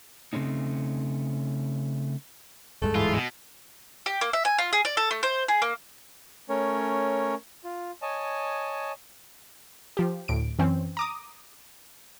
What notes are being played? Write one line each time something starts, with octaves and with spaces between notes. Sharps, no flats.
C#3 A3 C4 C#4 D#4
D1 G2 G#3 A3
G#2 E3 F4
B2
G4
A#3
E5
G#5
F4
G#4
D5
A4
A3
C5
G#4
A#3
A3 C#4 A#4 C#5
F4
C#5 D#5 G#5 A5
F3 G4
D2 A2 D7
F#2 E3 C4 C#4
A#5 D6 D#6